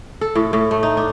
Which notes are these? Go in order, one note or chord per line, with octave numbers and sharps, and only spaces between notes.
A4
A2
A2
A3
D#4
D4